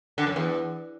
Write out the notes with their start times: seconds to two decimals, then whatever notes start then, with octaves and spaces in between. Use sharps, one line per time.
0.18 D3
0.27 F#2
0.36 E2